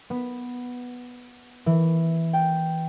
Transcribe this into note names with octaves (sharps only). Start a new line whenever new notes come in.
B3
E3
G5